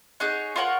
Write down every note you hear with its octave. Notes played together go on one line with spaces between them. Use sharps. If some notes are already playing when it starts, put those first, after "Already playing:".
D#4 G#4 C#5 F#5
F4 A#4 C#5 F#5